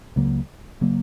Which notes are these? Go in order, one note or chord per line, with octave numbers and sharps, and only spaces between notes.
C#2 C#3 F#3 A#3
C#3 F#3 A#3